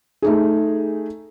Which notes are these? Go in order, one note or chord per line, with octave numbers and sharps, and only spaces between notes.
A3 D#4 G#4